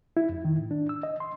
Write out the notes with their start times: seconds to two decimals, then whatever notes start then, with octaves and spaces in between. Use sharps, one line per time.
0.17 E4
0.29 F2
0.45 D#3
0.58 A2
0.71 D4
0.89 E6
1.03 D#5
1.20 C6